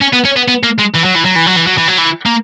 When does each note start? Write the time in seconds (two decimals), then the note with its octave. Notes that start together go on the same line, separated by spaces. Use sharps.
0.01 C#4
0.13 B3
0.25 C#4
0.36 B3
0.48 B3
0.64 A#3
0.79 G#3
0.95 E3
1.05 F#3
1.16 E3
1.26 F#3
1.36 E3
1.47 F#3
1.56 E3
1.67 F#3
1.78 E3
1.88 F#3
1.98 E3
2.26 A#3